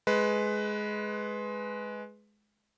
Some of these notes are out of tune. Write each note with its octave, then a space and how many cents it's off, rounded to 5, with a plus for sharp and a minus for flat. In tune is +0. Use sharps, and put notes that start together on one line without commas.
G#3 +15 B4 +10